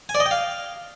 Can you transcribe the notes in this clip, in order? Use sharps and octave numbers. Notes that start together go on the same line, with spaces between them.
G#5
D5
D#5
G5
F5